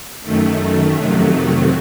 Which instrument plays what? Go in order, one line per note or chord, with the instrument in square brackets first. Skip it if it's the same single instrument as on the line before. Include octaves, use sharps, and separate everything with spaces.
[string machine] F#2 D#3 A3
F2 C3 D#3 F#3 A3